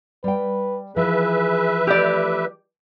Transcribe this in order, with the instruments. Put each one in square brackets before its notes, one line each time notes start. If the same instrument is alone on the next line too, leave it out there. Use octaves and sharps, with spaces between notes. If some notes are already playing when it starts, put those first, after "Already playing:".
[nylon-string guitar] G3 G5 [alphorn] B4
[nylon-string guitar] E3 F3 E4 [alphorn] G#4 [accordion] B4 E5
[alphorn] A3 [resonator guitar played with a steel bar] G4 D5